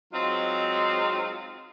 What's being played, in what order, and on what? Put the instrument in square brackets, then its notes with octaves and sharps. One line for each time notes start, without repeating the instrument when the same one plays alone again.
[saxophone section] F#3 G#3 C4 D#4 F4